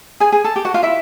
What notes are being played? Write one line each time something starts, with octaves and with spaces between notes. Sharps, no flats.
G#4 G#5
G#4 G#5
A4 A5
G4 G5
F#4 F#5
F4 F5
E4 E5